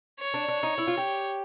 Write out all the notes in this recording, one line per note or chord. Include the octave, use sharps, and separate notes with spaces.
C#5
D4
D4
D#4
E4
F4
G4